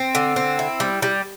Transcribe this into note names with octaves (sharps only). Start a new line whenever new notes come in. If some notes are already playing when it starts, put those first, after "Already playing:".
Already playing: C4
D3
C4
E4
G3
G3